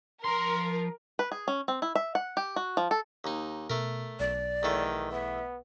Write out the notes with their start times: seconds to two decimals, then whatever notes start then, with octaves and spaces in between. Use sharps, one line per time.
0.24 F3 A#4 C6
1.19 B4
1.32 G#4
1.48 C#4
1.68 C4
1.82 E4
1.95 E5
2.15 F#5
2.37 G4
2.56 F#4
2.77 F3
2.91 A4
3.24 D#2 D#4 A#5
3.70 B2 A3 A#4
4.20 B1 D5
4.63 E2 D#3 A3
5.12 B3 E5